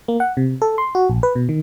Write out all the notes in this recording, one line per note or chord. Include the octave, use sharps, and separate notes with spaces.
A#3
F#5
C3
A4
C6
F#4
A#1
B4
B2
D#3